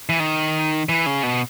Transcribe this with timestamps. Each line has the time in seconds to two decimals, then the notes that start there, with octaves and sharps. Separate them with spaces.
0.09 E3
0.20 D#3
0.89 E3
1.06 C#3
1.23 B2